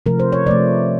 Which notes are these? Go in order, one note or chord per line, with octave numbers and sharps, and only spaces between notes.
C3 F3 A3 A#4
C5
C#5
C3 F3 A3 D5